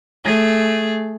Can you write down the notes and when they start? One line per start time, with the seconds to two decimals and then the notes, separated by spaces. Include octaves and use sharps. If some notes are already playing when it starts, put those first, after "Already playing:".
0.24 A3 G#4